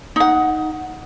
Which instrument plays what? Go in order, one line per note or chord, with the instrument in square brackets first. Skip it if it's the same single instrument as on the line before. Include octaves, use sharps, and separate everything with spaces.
[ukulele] D#4 F#5